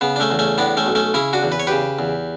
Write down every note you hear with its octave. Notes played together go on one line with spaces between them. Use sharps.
C#3 B3
D4
A3 C#4
E2
A3 C#4
A2 B3 D4
A3 C#4
B1
A3 C#4
C#3 C#4 E4
D4 F#4
E2
B4
C#5
C#3 G4 B4
E2